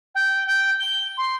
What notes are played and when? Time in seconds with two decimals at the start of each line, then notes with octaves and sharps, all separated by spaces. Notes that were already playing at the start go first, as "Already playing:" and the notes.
0.15 G5
0.46 G5
0.80 G7
1.17 C6